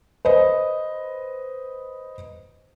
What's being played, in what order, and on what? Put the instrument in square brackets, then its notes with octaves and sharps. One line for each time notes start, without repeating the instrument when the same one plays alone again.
[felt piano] B4 C5 D#5